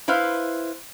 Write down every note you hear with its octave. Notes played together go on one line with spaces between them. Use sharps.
E4 B4 C5 F5